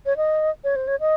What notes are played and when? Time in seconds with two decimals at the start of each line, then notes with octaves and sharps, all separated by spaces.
0.06 C#5
0.17 D#5
0.64 C#5
0.76 C5
0.87 C#5
1.00 D#5